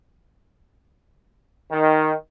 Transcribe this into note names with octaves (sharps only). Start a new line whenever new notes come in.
D#3